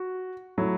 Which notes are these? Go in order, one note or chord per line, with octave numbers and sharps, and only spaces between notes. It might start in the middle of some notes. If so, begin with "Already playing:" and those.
Already playing: F#4
F#3 A3 E4